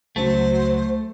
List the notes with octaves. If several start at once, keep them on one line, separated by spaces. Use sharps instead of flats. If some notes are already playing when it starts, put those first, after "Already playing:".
C#2 C#3 F#3 A3 C5